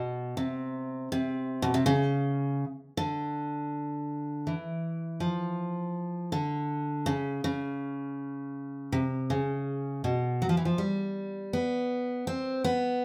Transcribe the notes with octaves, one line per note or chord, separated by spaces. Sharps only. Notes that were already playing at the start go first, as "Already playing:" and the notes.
Already playing: B2
C3
C3
B2
C3
C#3
D3
E3
F3
D3
C#3
C#3
C3
C#3
B2
F#3
F3
E3
F3
G3
B3
C4
B3